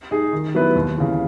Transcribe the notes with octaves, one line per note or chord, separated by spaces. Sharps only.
D#4 G#4
D#3
F#3 B3 E4 B4
D#2
C#3 E3